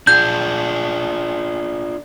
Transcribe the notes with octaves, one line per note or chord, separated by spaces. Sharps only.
D4 F4 G#4 G6